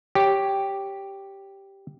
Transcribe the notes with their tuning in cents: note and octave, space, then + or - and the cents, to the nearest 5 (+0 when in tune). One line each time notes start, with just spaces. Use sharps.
G4 +0 C#5 +0